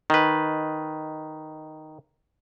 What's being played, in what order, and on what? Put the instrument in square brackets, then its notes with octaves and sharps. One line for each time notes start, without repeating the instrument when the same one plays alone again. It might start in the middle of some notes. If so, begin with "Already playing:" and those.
[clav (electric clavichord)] D#3 B4